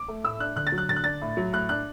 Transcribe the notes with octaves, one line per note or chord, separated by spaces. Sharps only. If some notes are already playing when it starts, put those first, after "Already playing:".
Already playing: D6
A3
A2 E6
D4 F#6
D3 F#6
A6
F#3
F#6
D3 A6
F#6
D4 A6
A2
F#3
A2 F#6
D4 F#6